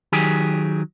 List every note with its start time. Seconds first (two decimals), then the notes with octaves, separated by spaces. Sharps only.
0.12 D#3 F#3 G4 G#4